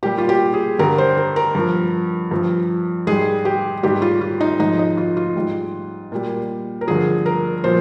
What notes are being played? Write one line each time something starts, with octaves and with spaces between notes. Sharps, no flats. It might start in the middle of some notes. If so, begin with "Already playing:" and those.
A#2 G3 G4
F4
G4
G#4
G2 D3 G3 A#4
C5
A#4
A#4
G2 F3
G2 F3
G#2 G3 G#4
G4
G#2 G3 G4
F4
F4
D#4
G#2 F3 D#4
D#4
F4
F4
G#2 G3
A#2 G3
A#4
G2 D3 F3 G#4
A#4
A#2 F3 C5